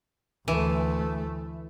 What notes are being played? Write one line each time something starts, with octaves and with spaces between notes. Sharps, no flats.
D2 E3 A3